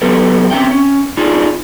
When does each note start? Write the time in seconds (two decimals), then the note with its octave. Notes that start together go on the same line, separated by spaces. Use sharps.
0.02 F#3 B3 G4 A4 B4
0.51 C4 C#4 E5 G5
0.71 C#4
1.17 D4 D#4 F4 G#4